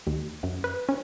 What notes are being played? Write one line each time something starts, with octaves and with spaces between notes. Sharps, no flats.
D#2
F#2
B4
C#4